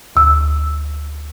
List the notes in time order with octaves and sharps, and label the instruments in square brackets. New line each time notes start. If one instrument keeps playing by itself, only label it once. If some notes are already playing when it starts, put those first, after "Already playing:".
[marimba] D2 E6